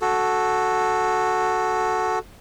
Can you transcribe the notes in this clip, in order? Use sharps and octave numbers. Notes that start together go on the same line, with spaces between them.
F#4 A4